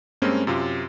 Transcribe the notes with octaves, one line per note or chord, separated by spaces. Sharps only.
G2 G#3 A#3 C4 C#4
F#2 C3 F4